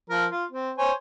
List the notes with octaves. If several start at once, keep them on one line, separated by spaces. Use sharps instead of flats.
F3 A#4
F4
C4
C5 C#5 G#5